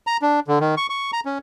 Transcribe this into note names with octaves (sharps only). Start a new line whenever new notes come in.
A#5
D4
D3
D#3
C#6
C#6
A#5
C#4